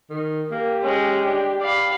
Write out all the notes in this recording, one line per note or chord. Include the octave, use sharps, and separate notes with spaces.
D#3
A#3 G4
G#3 C#4
D4
D5 F5 B5